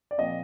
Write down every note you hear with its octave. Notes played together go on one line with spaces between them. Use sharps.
D5
A#2 F3 C4 D#5